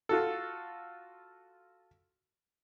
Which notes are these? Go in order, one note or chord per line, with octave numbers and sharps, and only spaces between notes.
F4 F#4 A4